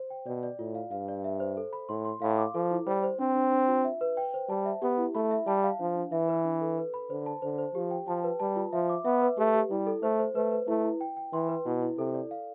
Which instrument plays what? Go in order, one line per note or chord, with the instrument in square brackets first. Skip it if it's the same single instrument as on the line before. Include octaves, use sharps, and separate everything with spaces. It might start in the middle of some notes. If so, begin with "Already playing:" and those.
Already playing: [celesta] C5
G5
[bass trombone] B2 [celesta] D5
[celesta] D5
[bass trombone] A2 [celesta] F4
[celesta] F5
[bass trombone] G2 [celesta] F5
[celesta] D5
E5
C5
A4
B5
[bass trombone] A2 [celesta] C6
[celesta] C6
[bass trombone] A2 [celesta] F5
[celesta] D6
[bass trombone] F3 [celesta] A4
[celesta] E4
[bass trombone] G3 [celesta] C5
[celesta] C5
[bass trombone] C4 [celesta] D4
[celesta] D4
D4
F4
E5
B4
G5
C5
[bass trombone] G3 [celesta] A5
[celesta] E5
[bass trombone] B3 [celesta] G4
[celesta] E4
[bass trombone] A3 [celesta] B5
[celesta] E5
[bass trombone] G3 [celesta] A5
[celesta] F5
[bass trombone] F3 [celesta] D4
[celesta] D4
[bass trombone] E3 [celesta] E5
[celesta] B4
D4
A4
B4
B5
[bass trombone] D3 [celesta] C5
[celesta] A5
[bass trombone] D3 [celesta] C5
[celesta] C5
[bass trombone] F3 [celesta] G4
[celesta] G5
[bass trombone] F3 [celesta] A5
[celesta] B4
[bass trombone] G3 [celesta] A5
[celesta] F4
[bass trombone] F3 [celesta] E5
[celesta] D6
[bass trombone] B3 [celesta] E5
[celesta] B4
[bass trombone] A3 [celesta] G4
[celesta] G4
[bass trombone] G3 [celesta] E4
[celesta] A4
[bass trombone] A3 [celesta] C5
[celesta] C5
[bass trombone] A3 [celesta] B4
[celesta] B4
[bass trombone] A3 [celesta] E4
[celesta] E4
G5
G5
[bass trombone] E3 [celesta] C6
[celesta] B4
[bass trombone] B2 [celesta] E4
[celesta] E4
[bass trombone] C3 [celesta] A4
[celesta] D5
F5